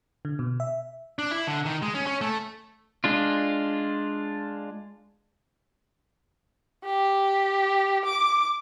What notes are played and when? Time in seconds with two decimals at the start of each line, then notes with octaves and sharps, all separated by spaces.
0.25 D3
0.39 B2
0.60 E5
1.19 D4
1.31 E4
1.47 D3
1.66 D#3
1.82 G#3
1.95 C#4
2.06 C#4
2.21 A3
3.04 G#3 D4 F4
6.84 G4
8.05 D6